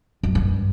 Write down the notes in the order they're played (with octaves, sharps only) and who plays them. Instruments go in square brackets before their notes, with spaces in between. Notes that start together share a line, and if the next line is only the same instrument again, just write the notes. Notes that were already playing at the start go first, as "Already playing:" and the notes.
[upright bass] F#2
G2